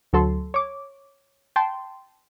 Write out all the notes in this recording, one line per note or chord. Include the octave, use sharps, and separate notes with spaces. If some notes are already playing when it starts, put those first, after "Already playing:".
D2 F#3 A4 C6
C#5 D6
G5 A5 C6